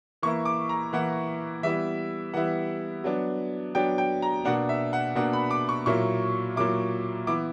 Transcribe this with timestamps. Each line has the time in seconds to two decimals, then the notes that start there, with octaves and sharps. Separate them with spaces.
0.23 E3 A#3 E4 C#6
0.45 D6
0.69 A#5
0.93 E3 A#3 E4 F#5
1.63 E3 G3 B3 E4 E5
2.34 E3 G3 B3 E4 F#5
3.04 F#3 B3 D4
3.75 F#3 B3 D4 G5
3.98 G5
4.22 A#5
4.45 B2 A#3 D4 F#5
4.69 E5
4.93 F#5
5.15 B2 A#3 D4 F#5
5.33 B5
5.51 D6
5.69 C#6
5.86 A#2 F#3 A#3 E4 C#6
6.56 A#2 F#3 A#3 E4 D6
7.27 E3 B3 E4 D6